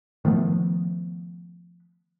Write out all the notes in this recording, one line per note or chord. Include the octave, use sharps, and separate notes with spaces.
D#3 F3 A3 B3